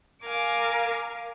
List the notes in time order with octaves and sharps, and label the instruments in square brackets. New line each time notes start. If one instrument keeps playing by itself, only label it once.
[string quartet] A#4 F5 G#5 D6